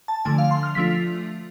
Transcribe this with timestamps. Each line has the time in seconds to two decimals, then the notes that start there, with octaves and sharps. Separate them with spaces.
0.08 A5
0.25 D3 F3 A3 D4 G#5
0.38 F5
0.51 C6
0.63 F6
0.75 F3 A3 D4 F4 B6